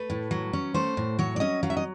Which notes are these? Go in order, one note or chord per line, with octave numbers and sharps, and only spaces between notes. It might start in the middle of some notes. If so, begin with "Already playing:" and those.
Already playing: A3 B4
A2
F#3
C#4
A3 C5
A2
F#3 C#5
D5
C#4 D#5
F#3 F5
E5
D#5